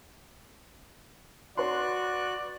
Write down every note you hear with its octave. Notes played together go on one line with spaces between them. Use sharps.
F#4 B4 D5 C6 F#6